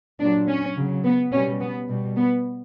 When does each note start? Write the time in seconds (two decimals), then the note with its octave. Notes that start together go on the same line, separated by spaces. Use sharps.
0.20 A#2 F#3 D4
0.48 C#4
0.76 C#3 F#3
1.04 B3
1.32 B2 G3 C#4
1.61 B3
1.89 B2 G3
2.17 B3